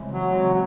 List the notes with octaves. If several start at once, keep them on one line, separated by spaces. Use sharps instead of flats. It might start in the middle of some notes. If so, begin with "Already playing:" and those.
Already playing: C#3 E3 G#3 C4
F#3
C#3 E3 G#3 C4